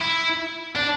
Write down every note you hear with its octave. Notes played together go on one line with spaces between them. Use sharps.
E4
D4